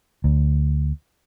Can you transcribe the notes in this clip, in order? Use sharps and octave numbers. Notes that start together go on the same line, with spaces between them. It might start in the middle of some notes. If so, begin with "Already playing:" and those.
D2